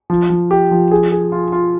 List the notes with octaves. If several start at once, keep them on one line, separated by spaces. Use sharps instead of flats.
F3
F3
G4
F3
G#4
G#4
F4
F4